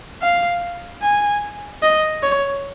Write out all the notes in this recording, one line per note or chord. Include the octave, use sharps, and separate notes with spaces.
F5
G#5
D#5
C#5